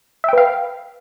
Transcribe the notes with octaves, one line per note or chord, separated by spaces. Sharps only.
B4 E5 F5 G5